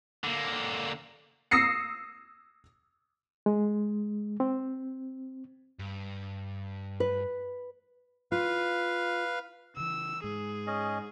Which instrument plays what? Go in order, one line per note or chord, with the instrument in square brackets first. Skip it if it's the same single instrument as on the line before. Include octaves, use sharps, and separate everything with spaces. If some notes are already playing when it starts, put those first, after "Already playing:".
[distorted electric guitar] D3 A#3
[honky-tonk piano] D#6 E6 A#6 C7 C#7
[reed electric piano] G#3
C4
[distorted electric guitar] G2
[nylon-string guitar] B4
[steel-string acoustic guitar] F4 [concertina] B4 F5
[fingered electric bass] C#3 E3 [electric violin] E6
[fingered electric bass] G#2 G#3 [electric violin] G#4
[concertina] C#4 D#5